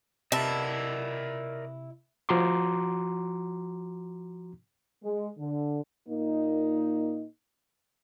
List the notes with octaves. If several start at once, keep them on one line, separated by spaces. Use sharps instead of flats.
C3 E4 A#4 B4 D5 D#5 A5
F3 F#4 A#5 C6 D6
G#3
D3
A#2 A#3 D#4